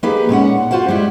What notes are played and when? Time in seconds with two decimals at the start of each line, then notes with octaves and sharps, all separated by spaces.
0.03 A#3 D#4 G4 G#4 B4
0.29 A#2 G#3 C#4 F#5
0.71 F4 F#4 C5 F5 F#5
0.88 G3 G#3 E4